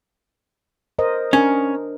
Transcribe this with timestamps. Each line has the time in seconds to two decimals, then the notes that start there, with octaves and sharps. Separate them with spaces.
0.99 A#4 C5 D#5
1.33 C#4 D4 A#4